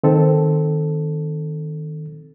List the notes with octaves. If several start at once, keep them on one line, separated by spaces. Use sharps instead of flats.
D#3 C4 A4